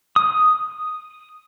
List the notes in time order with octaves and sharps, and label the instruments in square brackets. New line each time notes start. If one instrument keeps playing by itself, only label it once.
[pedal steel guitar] D#6